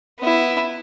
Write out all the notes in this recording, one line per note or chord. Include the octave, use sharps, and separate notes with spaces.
B3 E4